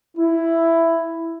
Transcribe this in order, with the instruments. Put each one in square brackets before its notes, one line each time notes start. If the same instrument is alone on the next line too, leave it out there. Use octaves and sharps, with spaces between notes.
[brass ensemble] E4